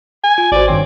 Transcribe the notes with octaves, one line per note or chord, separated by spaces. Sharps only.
G#5
F4
G#1 F#4 C5 D5
G2 D#3 C4 C#5